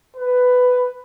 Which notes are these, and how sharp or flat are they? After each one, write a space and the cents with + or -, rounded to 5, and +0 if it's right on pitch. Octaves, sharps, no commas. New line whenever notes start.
B4 +10